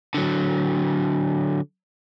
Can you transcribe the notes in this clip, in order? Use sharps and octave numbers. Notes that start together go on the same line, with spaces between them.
D3 F#3